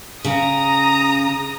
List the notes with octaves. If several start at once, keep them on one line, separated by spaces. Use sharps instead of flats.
C#3 A#5 D#6